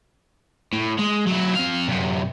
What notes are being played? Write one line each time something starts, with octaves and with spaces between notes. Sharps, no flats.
A2
G#3
F#3 E4
C4 F5
F#2 C3